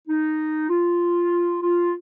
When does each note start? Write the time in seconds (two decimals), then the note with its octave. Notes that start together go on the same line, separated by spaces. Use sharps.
0.08 D#4
0.69 F4
1.62 F4